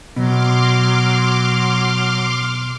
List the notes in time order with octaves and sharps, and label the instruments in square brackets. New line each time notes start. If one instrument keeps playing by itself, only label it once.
[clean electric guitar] B2 [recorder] F#3 [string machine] C6 D6 F6